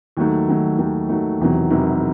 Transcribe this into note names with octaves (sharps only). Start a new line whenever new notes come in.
D#2 D#3 F#3 A3
D#2 D#3 F#3 A3
D#2 D#3 F#3 A3
D#2 D#3 F#3 A3
E1 E2 C3 D#3 F#3
E1 E2 C3 D#3 F#3